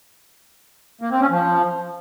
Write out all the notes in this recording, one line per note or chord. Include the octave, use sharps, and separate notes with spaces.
A#3
C4
C#4
F3